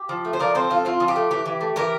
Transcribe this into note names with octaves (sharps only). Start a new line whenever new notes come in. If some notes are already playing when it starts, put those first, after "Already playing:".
Already playing: G4
F3
A3
C5
F3 A#4 D5
C4 A4 C5
F3 F4 A4
C4 F4
F3
G4
A3
E3 G4
E3
A3
E3 G4 A#4